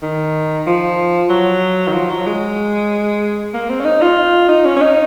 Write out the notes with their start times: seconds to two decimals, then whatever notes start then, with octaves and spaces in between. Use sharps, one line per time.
0.02 D#3
0.66 F3
1.29 F#3
1.87 D#3
1.93 F3
2.10 F#3
2.26 G#3
3.54 A#3
3.69 C4
3.80 C#4
3.85 D#4
4.01 F4
4.48 D#4
4.65 C#4
4.76 C#4
4.81 D#4